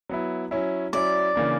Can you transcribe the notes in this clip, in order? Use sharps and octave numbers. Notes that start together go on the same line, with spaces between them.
F#3 B3 E4
F#3 C#4 E4
F#3 C#4 E4 D5
C#3 E3 A#3 D4